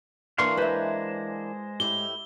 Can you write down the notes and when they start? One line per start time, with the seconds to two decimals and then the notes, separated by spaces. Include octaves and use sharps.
0.38 E3 A#3 D4 F5 C6 C#6
0.57 G#3 B4 C5 E5
1.80 A2 E4 G4 G7